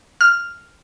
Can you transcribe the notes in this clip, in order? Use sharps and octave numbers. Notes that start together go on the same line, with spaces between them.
F6